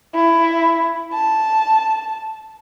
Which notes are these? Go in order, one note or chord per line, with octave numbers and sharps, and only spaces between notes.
E4
A5